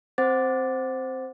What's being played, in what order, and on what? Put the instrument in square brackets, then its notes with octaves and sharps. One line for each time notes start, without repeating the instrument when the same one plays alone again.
[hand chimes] C4 C5 F#5 D6 A6